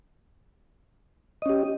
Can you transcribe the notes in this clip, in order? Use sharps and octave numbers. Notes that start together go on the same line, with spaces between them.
C#4 G4 D#5